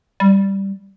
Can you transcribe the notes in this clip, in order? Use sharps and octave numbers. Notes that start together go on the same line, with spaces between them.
G3